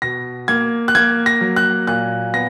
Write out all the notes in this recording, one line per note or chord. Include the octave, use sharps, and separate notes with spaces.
B2 A#6
A#3 G#6
F#6
A#3 G#6
A#6
F#3
F#6
A#2 F#6
B3 A#6